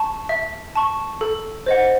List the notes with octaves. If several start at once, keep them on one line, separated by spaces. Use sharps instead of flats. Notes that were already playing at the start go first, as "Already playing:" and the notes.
Already playing: A5 C#6
E5
A5 C#6
A4
C5 D#5 F#5